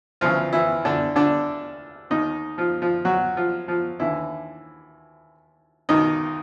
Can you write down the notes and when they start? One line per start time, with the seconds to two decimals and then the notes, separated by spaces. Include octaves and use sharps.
0.21 D2 C#3 E3 F3 F4
0.53 E3 E4
0.85 D3 D4
1.16 D3 D4
2.10 D#2 D#3 D#4
2.58 F3 F4
2.82 F3 F4
3.05 F#3 F#4
3.36 F3 F4
3.68 F3 F4
4.00 D#2 D3 E3 E4
5.89 C#2 B2 D#3 D#4